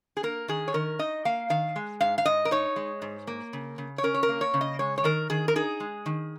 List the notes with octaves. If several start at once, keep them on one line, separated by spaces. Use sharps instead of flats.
G#4
A#3 A#4
D#3 G#4
C#5
D#3 A#4
D#4 D#5
A#3 F5
D#3 F5
G#3
G#2 F5
F5
G#2 D#5
A#4
D#4 C#5
G#3
G#2
A#3
C#3
C#3
C#5
C#4 A#4
C#5
A#4
A#3
C#5
C#3
D#5
G#3 C#5
C#5
D#3 A#4
D#3 G#4
A#4
D#4 G#4
G#3
D#3